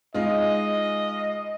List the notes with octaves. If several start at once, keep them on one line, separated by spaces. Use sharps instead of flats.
G#3 D#4 F4 D#5